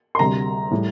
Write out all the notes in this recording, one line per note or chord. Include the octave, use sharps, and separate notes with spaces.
C6
D2 C3 G3 A#5
A2 G3